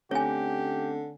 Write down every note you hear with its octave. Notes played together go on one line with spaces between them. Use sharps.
D3 A3 C4 C#4 G4 C#5 G#5